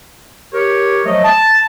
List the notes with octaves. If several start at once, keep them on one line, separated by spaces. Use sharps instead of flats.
G4 A#4 C#5
F3 F#3 A3 D#5
A5